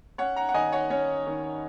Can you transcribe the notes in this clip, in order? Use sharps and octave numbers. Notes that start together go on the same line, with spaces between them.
C#4 C#5 F#5
F#5 A#5
F#5
D#3 D#5 G#5
C#5 F#5
C#4 C#5
D#3